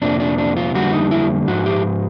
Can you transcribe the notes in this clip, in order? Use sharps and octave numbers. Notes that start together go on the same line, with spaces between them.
F2 C3 F3 A#3 D4
D4
D4
F4
F2 D3 G3 A#3 F#4
D#4
E4
G#2 F3 F#4
G4